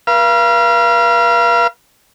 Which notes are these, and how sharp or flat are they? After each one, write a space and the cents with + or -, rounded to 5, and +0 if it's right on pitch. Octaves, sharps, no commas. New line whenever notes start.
B4 -45 F5 -30